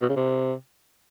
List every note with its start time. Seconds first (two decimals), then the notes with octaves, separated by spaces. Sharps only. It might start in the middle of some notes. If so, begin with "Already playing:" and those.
0.02 B2
0.09 C#3
0.16 C3